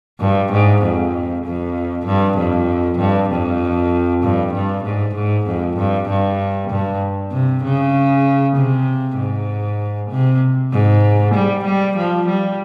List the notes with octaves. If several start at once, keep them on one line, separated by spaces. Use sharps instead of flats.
G2
G#2
F2
F2
G2
F2
G2
F2
G2
G2
G#2
G#2
F2
G2
G2
G2
C3
C#3
C3
G#2
C3
G#2
G3
G3
F3
G3